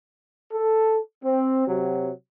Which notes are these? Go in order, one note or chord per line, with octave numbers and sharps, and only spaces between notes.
A4
C4
C3 F#3